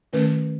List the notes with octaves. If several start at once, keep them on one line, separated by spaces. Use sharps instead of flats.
D#3 A3 C#4 B4